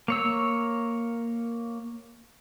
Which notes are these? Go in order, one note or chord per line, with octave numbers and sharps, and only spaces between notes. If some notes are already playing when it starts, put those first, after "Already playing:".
A#3 C#5 E6